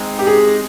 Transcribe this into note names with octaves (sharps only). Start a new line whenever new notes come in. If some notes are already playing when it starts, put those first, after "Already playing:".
Already playing: G#3 C4 D#4
G4
G#4